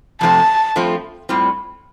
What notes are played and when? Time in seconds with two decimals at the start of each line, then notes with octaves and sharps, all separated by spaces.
0.21 F2 C3 F3 A3 C4 A5
0.76 G2 F3 A3 C4 F4
1.29 A2 G3 C4 F4